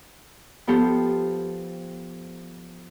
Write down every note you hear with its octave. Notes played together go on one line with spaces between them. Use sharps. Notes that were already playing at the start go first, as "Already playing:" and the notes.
F3 B3 G4 A4 C5